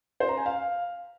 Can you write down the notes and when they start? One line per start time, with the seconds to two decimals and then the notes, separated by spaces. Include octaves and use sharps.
0.20 C5
0.29 A#5
0.37 G#5
0.46 F5